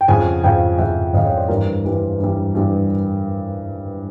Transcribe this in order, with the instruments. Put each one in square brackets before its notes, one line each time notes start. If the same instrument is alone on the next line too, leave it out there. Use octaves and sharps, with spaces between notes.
[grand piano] G5
F2 C#3 F3 F#5 G#5
F2 C#3 F3 F5 G5
F2 C#3 F3 E5 F#5
F2 C#3 F3 D#5 F5
C#5 D#5
C5 D5
G2 E3 G3 A#4 C5
G2 E3 G3 B4
G2 E3 G3
G2 E3 G3